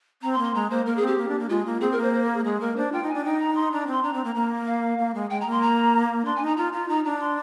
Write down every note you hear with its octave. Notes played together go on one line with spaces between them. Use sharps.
C4 A#5
C6
A#3
C6
G#3 A#5
A#3 C5
A#3 A#4
G#4
C4
G4
A#3
D4
A#3
G#3 F4
A#3
C4 G#4
A#4
A#3
C5
C5
A#4
G#4
G#3 G#4
A#3 A#4
D4 C5
F4 G5
D#4
G#5
D4
D#4 G5
A#5
C6
D4 A#5
C4
C6
D4 A#5
C4
A#3
A#3
F5
A#3
G#3
G#3 G5
A#5
A#3
C6
A#5
D4 C6
G#5
D#4
A#5
F4 A#5
F4 A#5
D#4 A#5
D4 A#5
C6